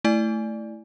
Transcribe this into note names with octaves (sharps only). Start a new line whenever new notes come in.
A3 E4 D5 G#5